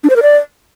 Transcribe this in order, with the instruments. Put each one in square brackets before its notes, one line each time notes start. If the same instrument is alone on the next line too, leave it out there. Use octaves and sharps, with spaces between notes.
[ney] D4
C5
A#4
D5